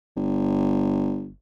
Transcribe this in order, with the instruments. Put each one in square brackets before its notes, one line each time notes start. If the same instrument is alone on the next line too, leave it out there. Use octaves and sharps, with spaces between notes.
[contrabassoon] G1